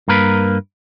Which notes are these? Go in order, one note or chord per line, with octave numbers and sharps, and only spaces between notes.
G2 A#3 A#4 B4